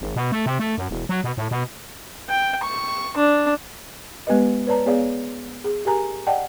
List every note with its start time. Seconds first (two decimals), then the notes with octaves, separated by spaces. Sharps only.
0.01 G#1
0.16 B2
0.32 A3
0.46 C3
0.59 A3
0.78 F#2
0.90 E1
1.09 F#3
1.24 B2
1.37 A2
1.51 B2
2.29 G5
2.63 C#6
3.17 D4
4.27 G#3 B3 G4 B4 D#5
4.67 B4 C#5 D5 A5 A#5
4.86 B3 G#4 C#5 D5 F5
5.64 G#4
5.85 G4 A#4 G#5 A#5
6.27 D5 D#5 F#5 G5 A5